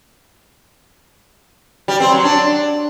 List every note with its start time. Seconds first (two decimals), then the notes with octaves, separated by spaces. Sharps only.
1.88 G3
2.00 C4
2.12 F#3
2.24 D4